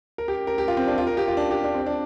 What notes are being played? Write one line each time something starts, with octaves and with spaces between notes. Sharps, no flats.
A#4
G4
A#4
G4
F4
C4
D4
F4
A#4
G4
F4
D4
G4
D4
C4
D4